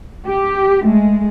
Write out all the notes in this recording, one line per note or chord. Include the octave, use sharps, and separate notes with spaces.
G4
G#3 A3